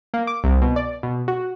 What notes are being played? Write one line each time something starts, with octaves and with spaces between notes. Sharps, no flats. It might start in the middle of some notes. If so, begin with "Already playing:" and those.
A#3
D6
C2
B2
D5
B2
F#4